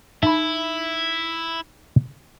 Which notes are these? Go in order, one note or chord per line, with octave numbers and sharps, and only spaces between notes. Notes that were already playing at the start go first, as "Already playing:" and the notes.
D#4 E4 E5 B5